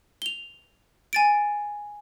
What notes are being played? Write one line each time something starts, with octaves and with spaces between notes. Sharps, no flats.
F7 G7
G#5 A6 D7